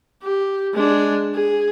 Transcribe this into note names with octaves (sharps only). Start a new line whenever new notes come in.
G4
G#3 D4
G#4